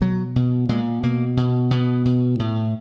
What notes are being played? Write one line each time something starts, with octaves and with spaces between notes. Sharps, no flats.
B2 F#3
B2
A#2 G#3
B2 A#3
B2
B2 B3
B2
A2